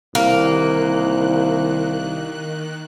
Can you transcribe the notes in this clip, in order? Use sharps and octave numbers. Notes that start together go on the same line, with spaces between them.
C2 D#3 A#3 F#6